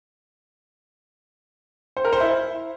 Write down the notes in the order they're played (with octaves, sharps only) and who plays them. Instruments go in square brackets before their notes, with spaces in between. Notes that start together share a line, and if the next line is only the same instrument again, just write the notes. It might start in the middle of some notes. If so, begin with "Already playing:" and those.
[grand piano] C5
A#4
C5
E4